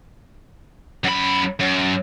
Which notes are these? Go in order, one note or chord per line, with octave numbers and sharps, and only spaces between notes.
F#2 B5
F#2